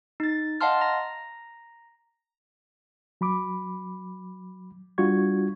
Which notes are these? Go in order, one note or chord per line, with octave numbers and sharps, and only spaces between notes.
D#4 A6
D#5 F5 F#5 A5 C6 F6
A#5 A#6
F#3 B5 D6
G3 D4 F4 F#4 C#6 G#6